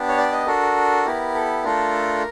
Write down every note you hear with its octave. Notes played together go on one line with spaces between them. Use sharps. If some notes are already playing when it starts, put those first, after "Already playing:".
Already playing: B3 D4 G4
C#5
D5
D#5
D4 F#4 A4 A#4
B3 E4 G4
A4
A3 D4 F4 A4 A#4